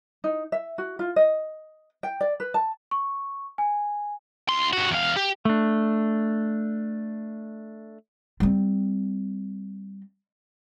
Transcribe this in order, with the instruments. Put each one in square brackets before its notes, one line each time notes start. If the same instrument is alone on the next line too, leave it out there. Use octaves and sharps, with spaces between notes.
[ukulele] D#4
E5
F#4
F4
D#5
G5
D5
B4
A5
[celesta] C#6
G#5
[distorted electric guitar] D2 C6
G2 F#4
E2 F5
G4
[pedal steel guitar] A3 D4
[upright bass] G3 C4